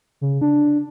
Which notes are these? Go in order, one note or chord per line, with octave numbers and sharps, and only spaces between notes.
C#3
D4